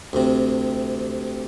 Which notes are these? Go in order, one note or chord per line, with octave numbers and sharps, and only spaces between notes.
D2 C3